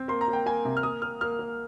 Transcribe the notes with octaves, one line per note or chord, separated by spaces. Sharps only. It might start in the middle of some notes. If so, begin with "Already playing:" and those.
Already playing: C4
A#3 C6
A#5
A#3
G5
A#3 G#5
C3
F6
A#3 D#6
A#3 F6
A#3 F6
A#3